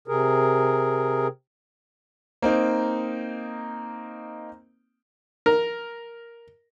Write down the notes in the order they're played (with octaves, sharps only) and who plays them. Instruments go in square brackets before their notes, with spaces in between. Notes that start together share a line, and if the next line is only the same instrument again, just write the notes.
[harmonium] C3 G#4 A#4
[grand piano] A#3 C4 D#4
[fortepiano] A#4